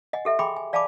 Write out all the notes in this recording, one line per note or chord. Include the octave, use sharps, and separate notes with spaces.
D#5 F#5 G#5
G4 A4 E5
G#4 G5 G#5 B5 C6 D6
G#5
D5 F5 G#5 A5 B5 D6